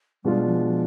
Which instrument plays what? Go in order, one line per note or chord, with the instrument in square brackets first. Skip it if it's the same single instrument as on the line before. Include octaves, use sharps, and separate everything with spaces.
[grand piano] B2 G#3 D4 F4 [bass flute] G3
[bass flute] F3
F3